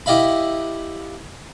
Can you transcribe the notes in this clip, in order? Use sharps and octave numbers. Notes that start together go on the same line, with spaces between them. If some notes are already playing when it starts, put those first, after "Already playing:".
E4 G4 D#5 F5 B5